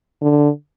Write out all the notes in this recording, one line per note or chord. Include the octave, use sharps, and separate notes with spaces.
D3